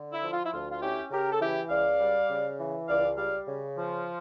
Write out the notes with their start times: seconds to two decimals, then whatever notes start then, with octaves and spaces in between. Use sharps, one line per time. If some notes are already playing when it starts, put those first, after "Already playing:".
Already playing: D3
0.13 E4
0.22 F3
0.32 F4
0.45 E4
0.52 D2 F4
0.70 F4
0.82 C#4 E4 G4
1.11 C#3 G4 A#4
1.32 A4
1.41 E3 E4 G4
1.70 C#2 D5 F5
2.00 G3
2.29 C#3
2.59 E3
2.88 C#2 D5 F5
3.17 G3 D5 F5
3.47 C#3
3.77 F3